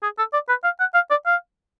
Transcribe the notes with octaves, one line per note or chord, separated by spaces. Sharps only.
G#4
A4
D5
B4
F5
F#5
F5
D5
F5